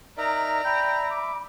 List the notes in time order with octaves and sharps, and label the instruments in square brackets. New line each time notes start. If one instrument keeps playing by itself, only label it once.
[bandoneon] D#4 A#4 E5 [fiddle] D5 A#5
[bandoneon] E5 [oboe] G5 [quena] B5
[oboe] D6